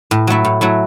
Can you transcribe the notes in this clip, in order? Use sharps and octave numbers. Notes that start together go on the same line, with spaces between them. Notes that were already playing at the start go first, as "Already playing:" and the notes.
A2
F#3 A3 E4
A2
F#3 A3 E4